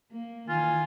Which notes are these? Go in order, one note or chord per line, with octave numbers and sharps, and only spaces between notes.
A#3
D#3 E3 F4 G#5